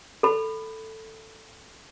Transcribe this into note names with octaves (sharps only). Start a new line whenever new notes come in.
A4 B5